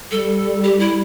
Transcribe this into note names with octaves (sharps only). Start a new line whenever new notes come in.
G3 A4
G4
E4